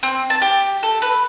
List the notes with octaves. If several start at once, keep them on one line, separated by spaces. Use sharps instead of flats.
C4
A5
G4
A4
B4